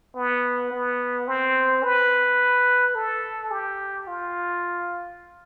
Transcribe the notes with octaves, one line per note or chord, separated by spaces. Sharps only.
B3
B3
C4
B4
A4
G4
F4